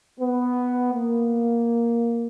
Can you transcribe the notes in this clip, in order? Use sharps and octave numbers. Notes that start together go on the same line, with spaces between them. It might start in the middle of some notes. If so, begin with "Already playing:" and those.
B3
A#3